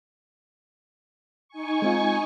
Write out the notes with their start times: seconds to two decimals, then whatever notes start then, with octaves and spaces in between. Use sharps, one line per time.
1.49 D#4 G#5 C#6
1.82 G#3 C4 F4